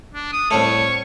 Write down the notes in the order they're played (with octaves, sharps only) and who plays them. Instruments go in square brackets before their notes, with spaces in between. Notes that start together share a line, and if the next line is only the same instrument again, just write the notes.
[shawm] D4
D#6
[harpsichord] C2 A2 A3 [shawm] C#5